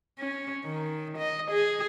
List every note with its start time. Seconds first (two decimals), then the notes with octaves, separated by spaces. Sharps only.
0.19 C#4
0.64 D#3
1.18 D#5
1.51 G#4